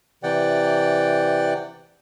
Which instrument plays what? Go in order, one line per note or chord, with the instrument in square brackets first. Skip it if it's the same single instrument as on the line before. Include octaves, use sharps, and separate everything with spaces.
[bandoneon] C3 E3 D5 F#5 G5